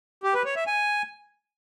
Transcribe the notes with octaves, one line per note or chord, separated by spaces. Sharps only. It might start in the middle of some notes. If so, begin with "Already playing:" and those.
G4
B4
C#5
E5
G#5